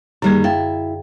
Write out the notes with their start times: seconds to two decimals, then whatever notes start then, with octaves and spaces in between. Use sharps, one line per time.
0.22 F#2 D3 D#3 G3 A#3 G#4
0.44 E4 F5 G5 A6